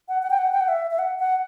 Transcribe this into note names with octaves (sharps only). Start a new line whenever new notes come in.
F#5
F#5
G5
F#5
G5
F#5
E5
E5
F#5
F#5